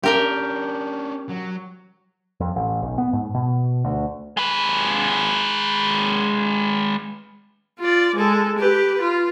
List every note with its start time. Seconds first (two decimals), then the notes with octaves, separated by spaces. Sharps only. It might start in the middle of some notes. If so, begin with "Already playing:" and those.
0.03 C#4 D4 G4 A#4 G5
1.29 F#3
2.40 F2
2.56 A1
2.82 B1
2.98 B3
3.13 G#2
3.34 B2
3.84 D2
4.37 G#3 B4
7.80 F4 D5
8.15 G#3 A4
8.58 G4 B4
9.00 F4